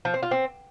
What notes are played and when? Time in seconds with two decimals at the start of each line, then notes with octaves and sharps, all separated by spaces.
0.05 F3
0.14 C4
0.23 F4
0.31 C4